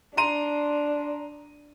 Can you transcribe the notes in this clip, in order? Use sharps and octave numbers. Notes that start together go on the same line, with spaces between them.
D4 A#5 C6 D#7